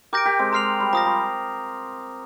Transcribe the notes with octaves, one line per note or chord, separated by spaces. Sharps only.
G4 A#4 D6 G6 A#6 D7
G4 A#4
G#3 C4
G#3 A#5 F6 C7 F7
G3
F3 A#5 D#6 A#6
G3